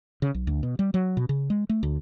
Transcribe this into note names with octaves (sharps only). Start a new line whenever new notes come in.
C#3
B1
D2
B2
G3
F#3
B2
C#3
G#3
A3
D2